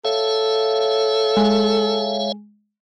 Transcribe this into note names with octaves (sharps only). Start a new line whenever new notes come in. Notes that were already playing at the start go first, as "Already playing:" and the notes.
A4 C#5 E5 F5
G#3